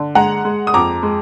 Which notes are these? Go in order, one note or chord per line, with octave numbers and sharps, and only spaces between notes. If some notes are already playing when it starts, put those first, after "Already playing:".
Already playing: D3
G#3 F#5 A#5
G#3
D#6
F2 A#5 D6
G#3